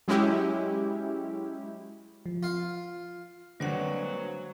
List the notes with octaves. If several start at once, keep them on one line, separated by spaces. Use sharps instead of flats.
F#3 G#3 C#4 E4 G4
F3
F4 F5
D3 F#3 G3 A#3 B4 C5 D5 F#5